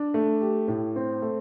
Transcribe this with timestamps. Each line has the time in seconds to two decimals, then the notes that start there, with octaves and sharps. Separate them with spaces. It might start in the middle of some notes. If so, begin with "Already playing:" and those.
Already playing: D4
0.14 A3
0.41 G4
0.68 A2
0.96 C4
1.22 A3